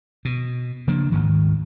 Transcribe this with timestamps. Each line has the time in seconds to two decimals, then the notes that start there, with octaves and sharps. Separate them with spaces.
0.25 B2
0.87 C#3 F3 A#3 D4
1.12 D2 G#2 D#3